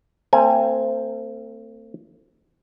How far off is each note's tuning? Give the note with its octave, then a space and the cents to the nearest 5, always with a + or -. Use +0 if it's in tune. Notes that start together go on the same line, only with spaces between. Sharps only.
A3 +45 C4 +0 G#5 +0